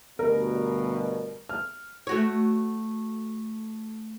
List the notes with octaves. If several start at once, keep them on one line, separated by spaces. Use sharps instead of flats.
D2 G2 B2 A#4
F6
A3 F#4 C#5